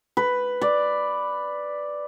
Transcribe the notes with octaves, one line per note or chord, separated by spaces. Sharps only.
B4
D5